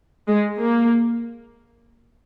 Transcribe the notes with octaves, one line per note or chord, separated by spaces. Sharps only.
G#3
A#3